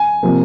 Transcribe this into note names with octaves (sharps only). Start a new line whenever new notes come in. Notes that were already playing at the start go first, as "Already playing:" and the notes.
Already playing: G#5
C3 F3 A#3